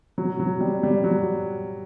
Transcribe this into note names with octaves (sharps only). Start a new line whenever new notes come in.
F#3
F#3
G3
G3
F#3